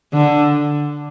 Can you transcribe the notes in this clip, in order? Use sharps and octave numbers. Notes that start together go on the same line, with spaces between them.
D3